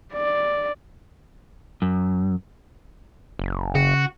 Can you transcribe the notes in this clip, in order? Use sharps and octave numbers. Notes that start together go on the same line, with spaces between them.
D5
F#2
F#1
C#3 F#4